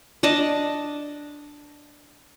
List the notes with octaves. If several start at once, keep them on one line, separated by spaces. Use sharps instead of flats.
D4 D5 D#5 A5